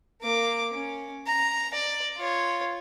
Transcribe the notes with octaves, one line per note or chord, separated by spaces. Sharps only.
A#3 D6
C#4
A#5
D5
F4 C#5